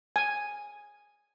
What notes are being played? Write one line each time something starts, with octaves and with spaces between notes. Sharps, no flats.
G#5